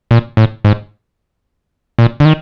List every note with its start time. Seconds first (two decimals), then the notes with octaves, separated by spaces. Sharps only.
0.11 A#2
0.37 A2
0.65 G#2
1.99 A#2
2.20 D3
2.25 D#3